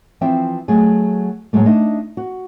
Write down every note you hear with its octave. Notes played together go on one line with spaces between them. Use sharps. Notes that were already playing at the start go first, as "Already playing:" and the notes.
E3 F3 C4 E5 G5
F#3 A3 G#4
A2 F#3 G#3 A3
A3 D4 D#4 D#5
F#4